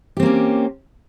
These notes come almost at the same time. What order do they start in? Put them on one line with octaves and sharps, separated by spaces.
G4 C4 A#3 C#4